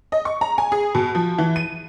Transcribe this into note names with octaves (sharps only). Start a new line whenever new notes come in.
D#5
C#6
A#5
G#5
G#4
B2
F3
E3
D#7